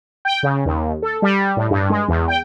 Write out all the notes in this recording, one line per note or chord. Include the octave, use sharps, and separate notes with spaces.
G5
C#3
D#2
A4
G3
A2
G2
G#3
E2
G5